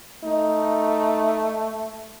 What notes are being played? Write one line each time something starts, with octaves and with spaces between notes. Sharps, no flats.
A3 D#4